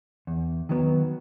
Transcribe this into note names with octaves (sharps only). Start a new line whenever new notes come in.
E2
D#3 F#3 B3